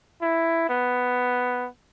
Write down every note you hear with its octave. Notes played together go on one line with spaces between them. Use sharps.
E4
B3